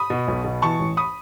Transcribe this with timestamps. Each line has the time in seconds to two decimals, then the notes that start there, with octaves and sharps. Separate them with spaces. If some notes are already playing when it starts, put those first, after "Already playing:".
Already playing: B5 D#6
0.10 B2
0.28 B1
0.44 B2
0.62 E3 A5 C#6
0.80 A1
0.97 B5 D#6